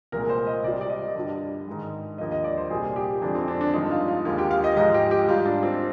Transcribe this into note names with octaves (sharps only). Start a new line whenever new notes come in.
C2 A#2 G#3 A#4
C5
D#5
C2 C3 G3 D5
D5
D#5
G2 D3 G3
G#2 D#3 G#3
D#2 D3 F3 D#5
D#5
D5
C5
C2 A#2 G3 G#4
G4
F2 D3 F3 G#3 D4
C4
D4
D4
G2 F3 G#3 D#4
F4
F4
D#2 D3 G#3 F4
G4
F5
D#5
G#2 F3 G#3 D#5
G4
G4
G#2 G3 F4
D4
C4